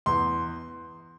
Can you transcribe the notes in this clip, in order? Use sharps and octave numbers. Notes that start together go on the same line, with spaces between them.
E2 C6